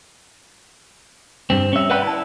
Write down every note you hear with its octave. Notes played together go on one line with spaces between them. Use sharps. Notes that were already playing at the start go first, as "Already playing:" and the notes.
G2 C4
C#4 E5
B4 D5 F#5 G5 B5
E4 A5